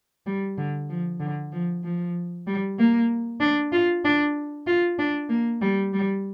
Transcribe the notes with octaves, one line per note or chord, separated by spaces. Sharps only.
G3
D3
F3
D3
F3
F3
G3
A#3
D4
F4
D4
F4
D4
A#3
G3
G3